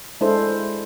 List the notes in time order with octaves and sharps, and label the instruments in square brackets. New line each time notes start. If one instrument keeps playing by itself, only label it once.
[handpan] G#3 D4 E4 G#4 A4 C5